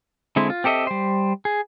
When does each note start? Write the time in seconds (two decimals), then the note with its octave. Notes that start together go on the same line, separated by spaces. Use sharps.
0.36 D3 G#3 C4 E4
0.50 F4
0.64 C4 G4 A4 D#5 E5
0.87 G3 C5
1.45 G#4